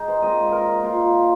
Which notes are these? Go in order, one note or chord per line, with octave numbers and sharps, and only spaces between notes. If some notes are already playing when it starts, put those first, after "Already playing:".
Already playing: D#4 G#4
C5
A#2 G#3 C4 D#5
A#4
A#2 A#3 F4